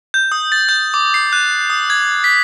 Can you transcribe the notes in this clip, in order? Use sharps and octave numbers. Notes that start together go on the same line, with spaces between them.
G6
D#6
A6
G6
D6
C7
F#6
D#6
G#6
B6